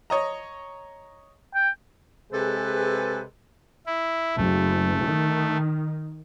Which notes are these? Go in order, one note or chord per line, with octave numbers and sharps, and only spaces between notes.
C#5 D#5 A#5
G5
C3 G#3 G#4 A4 B4
E4
F#1 A3
D#3